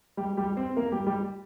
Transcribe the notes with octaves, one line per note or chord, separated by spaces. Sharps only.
G3 G4
G3 G4
C4 C5
A#3 A#4
G3 G4
G3 G4